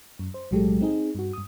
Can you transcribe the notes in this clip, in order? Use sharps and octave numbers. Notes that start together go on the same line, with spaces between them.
F#2
C5
B1 A2 F#3 G#3 G4 A4
C4 D#4 G#4
G2 F#4
G2 D#6